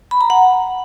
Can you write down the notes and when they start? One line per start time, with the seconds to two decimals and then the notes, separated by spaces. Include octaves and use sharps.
0.11 B5
0.21 A#5
0.30 F#5